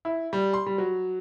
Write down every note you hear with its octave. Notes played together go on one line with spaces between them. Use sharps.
E4
G3
C6
G3
F#3